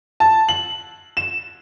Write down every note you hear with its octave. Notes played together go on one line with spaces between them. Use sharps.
A5
F#7
E7